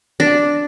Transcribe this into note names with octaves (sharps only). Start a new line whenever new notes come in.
D4